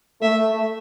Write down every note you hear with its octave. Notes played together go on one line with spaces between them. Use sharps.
A3 E5